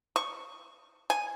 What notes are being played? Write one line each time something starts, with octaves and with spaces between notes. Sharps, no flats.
C#6
G#5